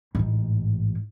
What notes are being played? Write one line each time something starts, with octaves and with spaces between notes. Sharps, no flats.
A1 G#2